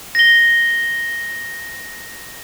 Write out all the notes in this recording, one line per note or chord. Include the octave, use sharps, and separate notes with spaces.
A#6 G7